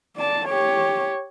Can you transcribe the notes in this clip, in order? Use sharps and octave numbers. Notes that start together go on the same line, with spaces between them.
D5 A5
G4 C#5